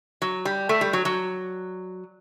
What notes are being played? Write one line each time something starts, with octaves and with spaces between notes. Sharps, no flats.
F#3
G3
A3
G3
F#3
F#3